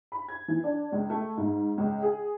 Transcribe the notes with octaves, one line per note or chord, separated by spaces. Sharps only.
B5
G#6
E3
D4
C#2
A3
G#2
C#2
G#4